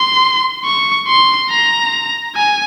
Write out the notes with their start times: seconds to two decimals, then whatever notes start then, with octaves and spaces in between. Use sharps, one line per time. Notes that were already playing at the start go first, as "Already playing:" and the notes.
Already playing: C6
0.65 C#6
1.08 C6
1.50 A#5
2.35 G#5